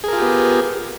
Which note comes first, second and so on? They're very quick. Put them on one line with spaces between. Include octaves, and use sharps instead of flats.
G#4 A#4 F4 G4 B3